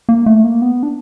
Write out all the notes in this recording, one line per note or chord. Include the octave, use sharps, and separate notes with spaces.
A#3
A3
A#3
B3
D4